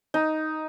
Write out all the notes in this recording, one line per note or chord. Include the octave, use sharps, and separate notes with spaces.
D#4